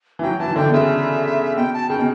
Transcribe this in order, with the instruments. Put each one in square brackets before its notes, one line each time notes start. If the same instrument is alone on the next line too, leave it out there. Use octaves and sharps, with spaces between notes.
[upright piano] E3
[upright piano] F#3 [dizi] G5
[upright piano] E3 [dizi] A5
[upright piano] E3
[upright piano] D3 [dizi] G5
[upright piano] B2
[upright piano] C#3 [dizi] E5
[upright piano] B2 [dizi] G5
[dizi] A5
[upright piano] C#3 [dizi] G5
[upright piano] B2